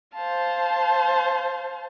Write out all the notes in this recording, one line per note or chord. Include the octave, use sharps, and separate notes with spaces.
C5 F5 A5